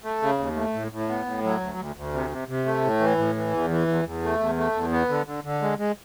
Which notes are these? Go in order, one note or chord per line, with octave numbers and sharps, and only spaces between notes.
A3
C#3
D#2
A3
A2
A2
B3
A2
F#3
D2
D2
D2
C3
C3
C3
A3
A2
E3
A2
E3
E2
E3
E2
E2
A3
E2
A3
E2
B3
D3
D3
D3
G#3
G#3